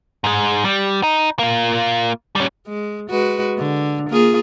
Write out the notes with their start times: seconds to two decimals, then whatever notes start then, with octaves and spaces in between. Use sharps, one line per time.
0.24 G#2 G#3
0.65 G3
1.03 D#4
1.39 A#3 F4
2.36 G3 C#4
2.67 G#3
3.10 G#3 F#4 B4
3.58 D3
4.10 A#3 F4 G#4